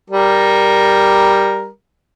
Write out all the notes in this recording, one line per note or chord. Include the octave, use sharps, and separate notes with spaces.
G3 A#4